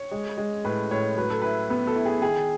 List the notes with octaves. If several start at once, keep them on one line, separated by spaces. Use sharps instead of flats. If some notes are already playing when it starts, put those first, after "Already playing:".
Already playing: C#5
G#3
G#3
A2 B4
A2 C#5
F#3 B4
A4
E4 B4
B3
A4
E4
G#4
D#3 G#4